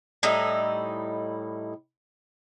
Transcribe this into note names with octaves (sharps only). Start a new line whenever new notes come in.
A2 G3 D#4 E4